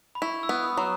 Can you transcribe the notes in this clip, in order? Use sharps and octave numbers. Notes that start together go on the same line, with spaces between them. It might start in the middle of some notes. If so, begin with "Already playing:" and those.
B5
E4 C#6
E6
B3
D#6
F#3